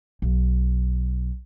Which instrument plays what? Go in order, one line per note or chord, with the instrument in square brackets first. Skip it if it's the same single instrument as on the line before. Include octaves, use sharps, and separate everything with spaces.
[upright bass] B1